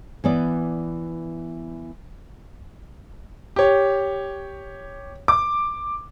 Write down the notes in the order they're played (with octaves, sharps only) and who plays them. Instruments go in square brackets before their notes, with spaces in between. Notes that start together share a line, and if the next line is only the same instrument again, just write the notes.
[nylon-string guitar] E3 B3 D5
[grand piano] G4 C#5
D6